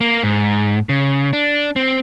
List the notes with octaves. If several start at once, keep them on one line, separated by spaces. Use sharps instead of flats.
A#3
G#2
C#3
D4
C4